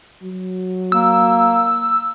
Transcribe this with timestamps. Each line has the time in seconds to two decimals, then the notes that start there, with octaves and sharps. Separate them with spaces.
0.23 F#3
0.92 A#3 E6